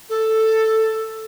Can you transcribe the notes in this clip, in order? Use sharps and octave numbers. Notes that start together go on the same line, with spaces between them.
A4